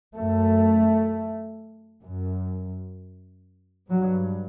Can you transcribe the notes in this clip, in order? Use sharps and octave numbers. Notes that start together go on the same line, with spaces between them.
F#2 A3
F#2
G2 F#3